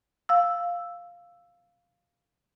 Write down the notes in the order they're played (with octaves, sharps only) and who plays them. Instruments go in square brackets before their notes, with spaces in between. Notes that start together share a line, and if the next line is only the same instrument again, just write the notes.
[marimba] F5 E6